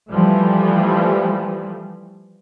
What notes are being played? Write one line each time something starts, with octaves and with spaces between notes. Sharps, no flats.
E3 F3 G3 A3